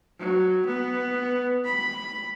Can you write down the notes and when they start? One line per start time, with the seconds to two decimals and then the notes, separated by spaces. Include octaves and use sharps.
0.19 F#3
0.66 B3
1.65 B5